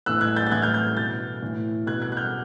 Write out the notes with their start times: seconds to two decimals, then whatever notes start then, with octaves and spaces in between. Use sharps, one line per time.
0.06 A2 E3 E6 F#6
0.21 F#6 G#6
0.36 G6 A6
0.47 A6
0.51 A2 E3 F#6 G#6
0.62 F6 G6
0.74 F6 G6
0.97 B2 G6 A6
1.42 A2 E3
1.86 B2 F#6 G#6
2.02 F#6 G#6
2.12 F#6
2.17 F6 G6